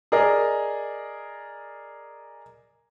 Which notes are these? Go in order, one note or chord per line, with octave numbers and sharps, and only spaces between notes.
G#4 A#4 D5 D#5